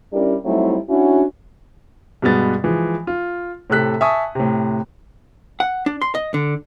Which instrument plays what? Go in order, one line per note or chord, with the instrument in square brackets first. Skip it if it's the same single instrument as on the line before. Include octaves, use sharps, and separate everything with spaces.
[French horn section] G3 C#4 D4 E4 G4 A#4
F#3 G3 A3 C4 D#4 E4
C#4 D4 E4 F#4
[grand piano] G2 B2 G#3 B3 A6
E3 F3 G#3
F4
A2 C3 A4 F#6 B6
E5 G#5 A5 C#6 D#6
A2 C3
[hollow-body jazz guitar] F#5
D4
C6
D#5
D3